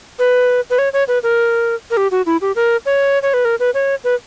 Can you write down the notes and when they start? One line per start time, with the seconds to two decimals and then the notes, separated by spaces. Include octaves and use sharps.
0.19 B4
0.70 B4
0.78 C#5
0.93 C#5
1.08 B4
1.23 A#4
1.91 A#4
1.97 G4
2.11 F#4
2.26 E4
2.41 G4
2.56 A#4
2.86 C#5
3.22 C#5
3.34 B4
3.45 A#4
3.60 B4
3.74 C#5
4.04 B4